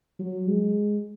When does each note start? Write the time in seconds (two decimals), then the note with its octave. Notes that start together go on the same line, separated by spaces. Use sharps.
0.19 F#3
0.48 G#3